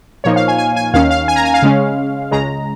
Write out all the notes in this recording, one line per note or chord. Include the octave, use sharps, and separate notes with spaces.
A#2 F3 A#3 D#4 C#5
F5
G#5
G#5
G#5
D#2 D#3 C#4 F5
F5
G#5
A#5
G#5
F5
C#3 G#3 C#4
C#2 C#3 G#3 A#5